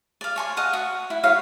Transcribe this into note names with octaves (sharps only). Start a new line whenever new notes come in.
D5 F5
C#5 G#5 C6
D#5 F5 F#5
F#4
E4
E4 F#4 C#5 F5